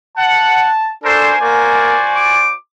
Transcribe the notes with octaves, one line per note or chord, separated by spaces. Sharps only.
F#5 A5
D4 F#4 A4 A#4 C5 G#5
A#3 F#4 C5 D5
D6